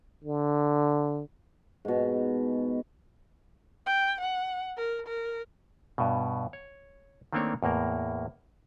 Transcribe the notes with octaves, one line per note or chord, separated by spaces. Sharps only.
D3
G#2 B2
G5
F#5
A#4
A#4
G2 B2
C#5
D#3 A3 A#3 C4 D4 C#5
E2 A2 A#3 A#4